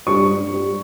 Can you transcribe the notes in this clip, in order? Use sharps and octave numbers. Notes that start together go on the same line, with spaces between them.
G2 C#6
G2
G3